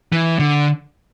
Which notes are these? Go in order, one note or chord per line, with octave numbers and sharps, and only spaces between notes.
E3
D3